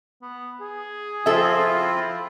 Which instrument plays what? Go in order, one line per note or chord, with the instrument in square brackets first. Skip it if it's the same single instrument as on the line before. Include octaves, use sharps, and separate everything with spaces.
[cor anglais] B3
G#4
[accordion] F3 C4 F4 [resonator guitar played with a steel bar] A4 E5
[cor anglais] E4